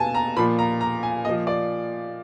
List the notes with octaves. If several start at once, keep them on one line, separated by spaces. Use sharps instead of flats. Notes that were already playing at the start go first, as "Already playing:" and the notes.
Already playing: B2 G#5 A5
A#5
A#2 F3 B5
A#5
A#5
G#5
A#2 F3 D#5
D5